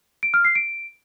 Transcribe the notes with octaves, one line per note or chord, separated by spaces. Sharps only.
D7
F6
C7
D7